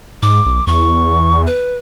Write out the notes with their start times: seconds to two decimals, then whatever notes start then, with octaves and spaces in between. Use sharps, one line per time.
0.22 G#2 D6
0.46 B1
0.67 E2 C#6
1.46 B4